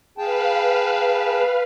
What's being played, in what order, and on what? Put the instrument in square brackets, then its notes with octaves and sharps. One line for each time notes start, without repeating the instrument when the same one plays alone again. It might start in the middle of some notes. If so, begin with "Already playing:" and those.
[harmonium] G#4 G5 A5 [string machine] B4 F5